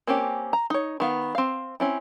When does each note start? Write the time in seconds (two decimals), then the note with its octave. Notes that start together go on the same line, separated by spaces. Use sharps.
0.07 A#3 C4 C#4 G4
0.53 A#5
0.70 D#4 C#5
1.00 D#3 B3 F5
1.35 C4 F5
1.80 C4 C#4 E4